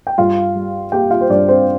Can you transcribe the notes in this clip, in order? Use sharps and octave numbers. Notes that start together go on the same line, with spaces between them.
G5
G2 F4 F5
G3
A#3 G4 G5
F4 F5
C5
G2 D4 D5
C4 C5